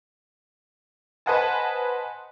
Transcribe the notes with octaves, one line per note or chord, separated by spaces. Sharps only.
B4 C5 D#5 F#5 G#5 A5